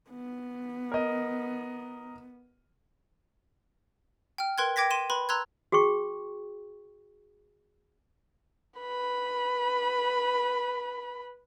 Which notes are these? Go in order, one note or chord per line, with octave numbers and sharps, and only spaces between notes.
B3
A#4 D#5
G5 F6
A#4 B4 G5 C6 F#6 G#6
G5 D6 G#6 A#6 B6
C6 D#7 E7
B4 B5 C6
A#5 C6 E6 F#6 G#6
F#4 G#4 G5 C#6
B4 B5